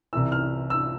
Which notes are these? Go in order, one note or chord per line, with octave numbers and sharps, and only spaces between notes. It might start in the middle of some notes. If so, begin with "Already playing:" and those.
C2 C3 E3 E6
F6
E6